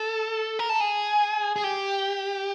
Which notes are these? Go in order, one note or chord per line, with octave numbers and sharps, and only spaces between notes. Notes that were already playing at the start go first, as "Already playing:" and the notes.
Already playing: A4
A#4
A4
G#4
G#4
G4